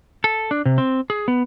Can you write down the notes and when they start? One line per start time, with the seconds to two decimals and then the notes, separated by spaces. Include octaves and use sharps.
0.24 A4
0.51 D4
0.65 C3
0.78 C4
1.10 G#4
1.28 B3